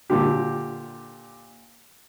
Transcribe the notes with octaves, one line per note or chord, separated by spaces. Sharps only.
A#2 D3 G4